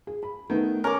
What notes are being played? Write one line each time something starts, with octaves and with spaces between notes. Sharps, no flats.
G#4
B5
D#3 A3 B3 B4
C#4 A#4 D6